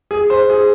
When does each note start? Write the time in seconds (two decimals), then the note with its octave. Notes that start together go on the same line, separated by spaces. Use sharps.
0.11 G#4
0.30 C5
0.50 G#4